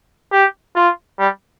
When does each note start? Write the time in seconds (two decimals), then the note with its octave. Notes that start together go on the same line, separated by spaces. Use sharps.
0.32 G4
0.76 F4
1.20 G3